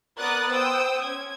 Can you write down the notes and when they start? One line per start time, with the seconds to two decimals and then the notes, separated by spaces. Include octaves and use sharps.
0.17 B3 A#4 D5 D#6 F#6 A6
0.50 C5 G5 D#6 E6
1.03 C#4 G#6